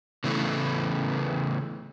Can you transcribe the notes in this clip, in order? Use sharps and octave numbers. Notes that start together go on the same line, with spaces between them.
C#3 E3 A3 B3